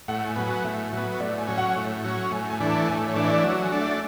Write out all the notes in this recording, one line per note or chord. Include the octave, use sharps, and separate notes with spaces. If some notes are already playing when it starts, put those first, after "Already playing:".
A2 F#5
G#5
F#3 B3
G#5
A2 E5
F#3 B3
A2 D5
G#5
F#3 C#4
F#5
A2
F#3 C#4
A2 G#5
G#5
E3 A3 D4
A5
A2 G#5
C#5
E3 A3 D4 E5
D5
F#3 C#5
G#5
A3 D4
E5